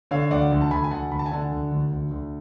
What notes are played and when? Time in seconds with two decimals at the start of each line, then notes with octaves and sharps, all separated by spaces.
0.11 D3 C#5 F5
0.31 D2 D5 F#5
0.52 D2
0.61 A5
0.71 D2 G#5 B5
0.84 G#5
0.91 D2 F#5 A5
1.11 D2 B5
1.19 A5
1.26 G#5
1.31 D3 F#5 A5
1.52 D2
1.72 D2
1.91 D2
2.11 D2